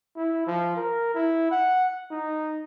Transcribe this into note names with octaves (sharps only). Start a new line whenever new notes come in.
E4
F3
A#4
E4
F#5
D#4